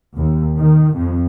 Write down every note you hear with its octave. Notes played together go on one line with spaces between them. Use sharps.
D#2
D#3
F2